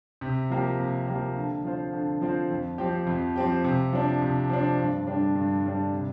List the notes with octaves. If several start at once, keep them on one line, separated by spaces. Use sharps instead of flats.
C3
F3 A#3 G4
C3
F3 A#3 G4
D3
F3 C4 F4 C5
D3
F3 C4 F4 C5
F2
F3 C4 G4
F2
F3 C4 G4
C3
F3 D4
C3
F3 D4
G2
D3 G3 D4
G2
D3 G3 D4
C3